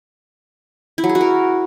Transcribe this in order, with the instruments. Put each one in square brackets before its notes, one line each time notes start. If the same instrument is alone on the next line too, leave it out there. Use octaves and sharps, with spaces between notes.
[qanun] E4
F#3
G#4
F#4
A#4